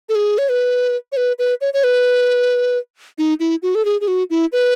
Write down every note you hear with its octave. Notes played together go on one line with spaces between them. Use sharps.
A4
G#4
C#5
B4
C#5
B4
B4
C#5
C#5
B4
D#4
E4
F#4
A4
G#4
G#4
F#4
E4
B4